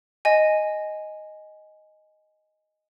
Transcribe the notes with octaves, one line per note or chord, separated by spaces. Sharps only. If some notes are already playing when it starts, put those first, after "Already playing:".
D#5 G#5